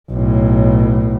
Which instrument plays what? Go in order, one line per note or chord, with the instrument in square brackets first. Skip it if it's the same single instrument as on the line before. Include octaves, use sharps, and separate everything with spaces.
[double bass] B1 A2